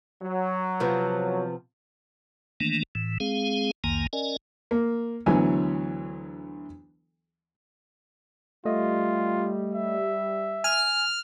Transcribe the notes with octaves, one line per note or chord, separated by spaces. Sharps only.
F#3
C3 F3 B3
D#3 E3 A3 A#3 D4
A2 E3
G#3 C4 G#4 F5
C2 F2 D#3 A#3 G#5 A#5
C#4 A#4 D5 D#5 G#5
A#3
D2 E3 F#3 B3 G#5
G3 A3 F4 D#5
E5
G#5 F6